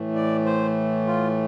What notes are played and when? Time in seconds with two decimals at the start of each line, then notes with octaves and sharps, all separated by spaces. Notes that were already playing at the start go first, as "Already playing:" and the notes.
Already playing: A2 E3 A3
0.15 D5
0.45 C5
1.06 F4